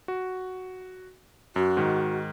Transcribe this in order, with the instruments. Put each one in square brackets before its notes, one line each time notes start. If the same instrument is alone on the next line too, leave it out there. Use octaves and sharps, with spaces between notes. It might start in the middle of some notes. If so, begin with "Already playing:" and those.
[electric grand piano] F#4
[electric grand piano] F#2 [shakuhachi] F#4
[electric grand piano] G#2 D#3